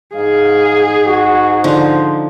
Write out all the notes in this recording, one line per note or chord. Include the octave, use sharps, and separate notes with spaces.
G#2 G#4 F5
F#4
D3 F3 D#4 C5